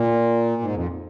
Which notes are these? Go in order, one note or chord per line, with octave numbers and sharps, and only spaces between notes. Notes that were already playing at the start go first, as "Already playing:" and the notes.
Already playing: A#2
G#2
F2